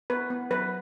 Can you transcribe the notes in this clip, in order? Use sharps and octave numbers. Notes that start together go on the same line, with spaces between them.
B3 B4
B3
F#3 B4